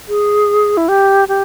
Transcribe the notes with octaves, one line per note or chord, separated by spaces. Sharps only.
G#4
E4
G4
G4